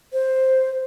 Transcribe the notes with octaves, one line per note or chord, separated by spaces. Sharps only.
C5